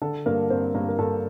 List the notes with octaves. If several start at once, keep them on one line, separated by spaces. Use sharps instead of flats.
D3 A4
G2 A#3 A#4
G2 C4 C5
G2 A#3 A#4
A#4
G2 A4